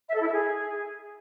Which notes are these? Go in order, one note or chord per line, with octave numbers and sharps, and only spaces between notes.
E5
A4
E4
E5
G#4